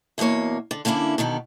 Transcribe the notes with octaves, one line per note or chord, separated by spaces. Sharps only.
E2 B2 F3 A#3 C#5
D3
D3 A#3 C#4 D4 E4
B2 D3 D#3 B3